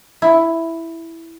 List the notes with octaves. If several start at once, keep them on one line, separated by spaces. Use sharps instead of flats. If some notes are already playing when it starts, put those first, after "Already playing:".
E4